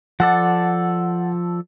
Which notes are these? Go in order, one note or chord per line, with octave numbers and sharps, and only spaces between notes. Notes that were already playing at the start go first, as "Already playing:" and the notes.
F3 A4 D5 F#5